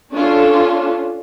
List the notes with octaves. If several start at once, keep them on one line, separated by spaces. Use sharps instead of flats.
C#4 D4 F4 A4